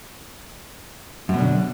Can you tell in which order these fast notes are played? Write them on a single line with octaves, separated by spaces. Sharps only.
F#2 B2 D3